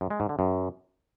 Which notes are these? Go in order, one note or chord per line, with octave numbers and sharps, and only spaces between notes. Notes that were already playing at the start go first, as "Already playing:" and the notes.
F#2
G#3
G#2
D3
F#2